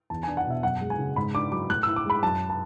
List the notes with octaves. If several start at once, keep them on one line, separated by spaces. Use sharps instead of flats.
E2 A5
D4 G#5
F#5
B2 E5
F#2 F#5
G#3
G#5
C#3
G#2 B5
D4 D6
F#3 D6
A2 F#6
E4 E6
D6
G#3 B5
F#2 A5
A5